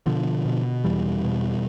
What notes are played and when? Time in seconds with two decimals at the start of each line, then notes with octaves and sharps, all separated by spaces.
0.06 B2 D3 F3
0.45 B2
0.84 E2 E3 G3
1.24 B2